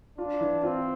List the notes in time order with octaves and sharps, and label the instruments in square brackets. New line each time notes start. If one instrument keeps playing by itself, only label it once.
[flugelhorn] D4 [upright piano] F4
[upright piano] E3
[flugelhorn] C4 [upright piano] F4